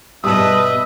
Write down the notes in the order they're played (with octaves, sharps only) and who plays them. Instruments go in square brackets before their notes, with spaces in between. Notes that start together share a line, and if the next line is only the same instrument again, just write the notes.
[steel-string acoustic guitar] G2 B2 G3 [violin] B4 D#5 [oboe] E5 [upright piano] A5 D#6